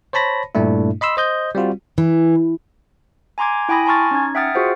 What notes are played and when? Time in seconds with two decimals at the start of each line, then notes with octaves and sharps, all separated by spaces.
0.13 C5 C#5 A5 B5 A#6
0.55 G2 A#2 A3 D4 E4
1.01 D#5 B5 C6 E6
1.17 C5 D#5 G6
1.55 G3 C4 F4 F#4
1.98 E3
3.38 G#5 A#5 C6 D6 G#6
3.69 E4 G5 G#5 B5 D#6 A#6
3.86 G#5 A5 C6 C#6 F6 A6
4.11 C#4 D#4 G#6
4.35 E5 F#5 G5 D#6 F6 A6
4.55 F4 F#4 G#4 C5 F#5